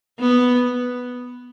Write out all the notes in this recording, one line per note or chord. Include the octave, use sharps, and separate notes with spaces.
B3